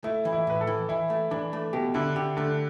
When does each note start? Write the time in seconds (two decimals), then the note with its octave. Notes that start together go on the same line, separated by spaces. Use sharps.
0.04 A3 E4
0.25 E3
0.33 E4
0.47 A2 B4
0.61 A4
0.67 E3
0.89 E3 E4
1.10 A3
1.31 E3 D4
1.53 A3
1.73 B2 G4
1.94 D3 E4
2.16 D3 G4
2.37 D3 A3